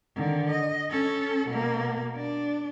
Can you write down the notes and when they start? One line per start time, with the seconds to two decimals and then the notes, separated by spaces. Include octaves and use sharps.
0.16 D3 D#3
0.50 D#5
0.90 C#4 A4
1.48 B2 A#3
2.15 D4